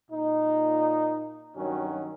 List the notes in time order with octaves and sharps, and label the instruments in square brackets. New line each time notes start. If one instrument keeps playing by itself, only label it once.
[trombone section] A#2 D#4
G2 D#3 F#3 C#4 F#4